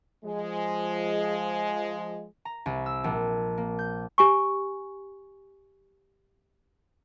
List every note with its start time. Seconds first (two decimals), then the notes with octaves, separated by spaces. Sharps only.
0.24 F3 G#3
2.45 A#5
2.66 C2
2.86 E6
3.04 A#1
3.58 A#3
3.79 G6
4.18 G4 G#5 C#6